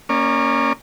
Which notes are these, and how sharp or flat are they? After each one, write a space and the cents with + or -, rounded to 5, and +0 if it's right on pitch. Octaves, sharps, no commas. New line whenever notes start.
A#3 +0 C#4 +0 D5 +35